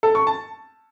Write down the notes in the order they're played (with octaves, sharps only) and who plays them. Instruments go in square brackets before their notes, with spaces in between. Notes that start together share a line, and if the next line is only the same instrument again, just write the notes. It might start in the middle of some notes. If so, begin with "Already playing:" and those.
[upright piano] A4
C#6
A5